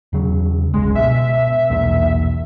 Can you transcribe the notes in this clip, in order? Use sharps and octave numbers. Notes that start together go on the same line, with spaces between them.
E2 C#3 F#3
G1 C#2 G2 G#3
B2 E5
B1 E2 A#2